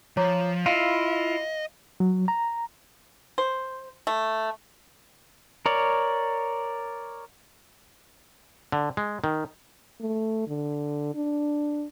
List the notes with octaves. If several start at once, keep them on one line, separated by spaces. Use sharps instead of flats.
F3 C#5 A#5 D6
E4 F4 D#5 F5
F#3
A#5
C5
A3
A#4 C#5 D5
D3
G#3
D#3
A3
D3
D4